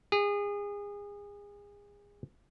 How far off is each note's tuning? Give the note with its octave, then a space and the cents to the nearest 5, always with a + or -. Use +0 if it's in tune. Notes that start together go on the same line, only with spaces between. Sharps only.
G#4 -30